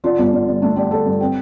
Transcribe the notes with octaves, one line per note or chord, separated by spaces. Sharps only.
D3 F4
G1
D3
G1
A3 D4
D3 G4
D3 A4
G2
C4